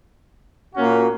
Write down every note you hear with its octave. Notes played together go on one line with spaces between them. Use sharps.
A#2 A#3 C#4 F#4